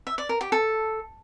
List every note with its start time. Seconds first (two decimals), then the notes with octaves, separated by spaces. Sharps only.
0.07 E5
0.18 D5
0.29 A#4
0.41 G4
0.52 A4